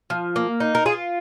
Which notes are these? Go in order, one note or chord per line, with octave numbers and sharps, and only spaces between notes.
F3
A#3
D#4
A#4
F4 G#4